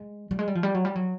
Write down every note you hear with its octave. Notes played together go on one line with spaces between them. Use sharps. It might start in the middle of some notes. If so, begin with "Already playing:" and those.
Already playing: G#3
G3
G#3
G3
F3
G3
F#3
G3
F#3